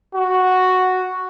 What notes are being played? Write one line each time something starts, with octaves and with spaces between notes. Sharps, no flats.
F#4